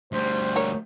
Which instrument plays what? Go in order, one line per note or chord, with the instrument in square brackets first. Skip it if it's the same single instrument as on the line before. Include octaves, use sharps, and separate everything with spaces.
[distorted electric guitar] D2 G3 [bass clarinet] C5
[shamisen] A#3 F#4 C#5